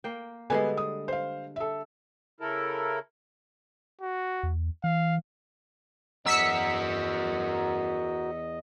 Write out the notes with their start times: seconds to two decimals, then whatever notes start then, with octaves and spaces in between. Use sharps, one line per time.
0.04 A#3 G5
0.50 D3 G3 G#3 B3 B4 G#5
0.77 D#6
1.08 C5 F5
1.56 A4 E5
2.40 C#3 E4 A4 A#4
4.01 F#4
4.43 E2
4.84 E3 F5
6.26 E2 F#4 A#4 D#5 E6 B6 C#7